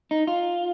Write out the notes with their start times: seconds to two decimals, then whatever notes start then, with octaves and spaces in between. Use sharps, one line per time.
0.11 D#4
0.27 F4